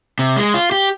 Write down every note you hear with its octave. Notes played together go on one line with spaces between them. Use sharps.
C3
G#3
F4
G4